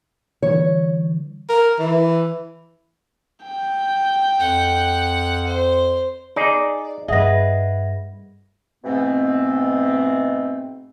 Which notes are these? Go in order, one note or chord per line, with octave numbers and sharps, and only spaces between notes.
D3 E3 G3 C#5
A#4
E3
G5
F2 F#5
C5
D#4 G#4 D5
G2 G3 G#4 B4 D#5 E5 F#5 A#6
G#2 B2 E3 A3 B3 C4